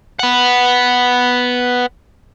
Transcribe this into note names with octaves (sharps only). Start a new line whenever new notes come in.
B3 F#5